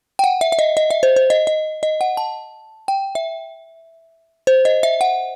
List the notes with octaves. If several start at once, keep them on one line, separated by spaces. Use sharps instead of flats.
G5
F#5
E5
E5
D#5
D#5
E5
C5
C5
D#5
D#5
D#5
F#5
A5
G5
E5
C5
D#5
E5
F#5